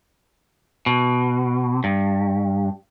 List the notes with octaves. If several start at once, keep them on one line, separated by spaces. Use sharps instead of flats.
B2
G2